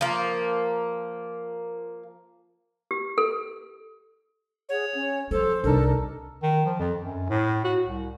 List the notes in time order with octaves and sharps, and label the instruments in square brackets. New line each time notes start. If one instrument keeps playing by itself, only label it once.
[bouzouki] F3 A#3
[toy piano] G4
A4
[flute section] G#4 F#5 [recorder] C#5
[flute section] C#4
[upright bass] E3 F3 [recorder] A4 [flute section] C5
[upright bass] C2 [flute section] D4 D#4 A#4 [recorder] A4
[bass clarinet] D#3
F3
F2
F#2
A2
F#4
C2